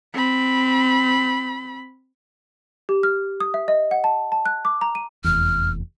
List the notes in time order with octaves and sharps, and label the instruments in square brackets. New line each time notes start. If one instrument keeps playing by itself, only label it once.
[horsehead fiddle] C4 B5
[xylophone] G4
F6
D#6
E5
D#5
F#5
A5
A5
F#6
D6
A#5
D#7
[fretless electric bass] F1 E2 [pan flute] F6